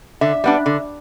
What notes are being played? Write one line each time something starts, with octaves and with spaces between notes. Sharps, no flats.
D3 E5
G3 B3 D4
D3